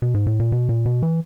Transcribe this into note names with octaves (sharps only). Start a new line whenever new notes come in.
B2
G#2
A2
A#2
B2
A#2
B2
E3